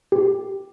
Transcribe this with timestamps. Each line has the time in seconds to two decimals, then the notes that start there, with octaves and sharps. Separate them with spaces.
0.12 G4